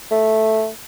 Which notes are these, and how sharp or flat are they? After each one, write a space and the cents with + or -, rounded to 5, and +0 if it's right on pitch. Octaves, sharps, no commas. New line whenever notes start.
A3 -5